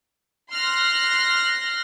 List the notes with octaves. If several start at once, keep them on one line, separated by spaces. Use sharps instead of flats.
C6 F6 F#6 A#6